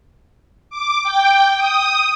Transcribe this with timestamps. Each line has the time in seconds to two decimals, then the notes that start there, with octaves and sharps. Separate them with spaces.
0.70 D6
1.03 G5
1.58 D#6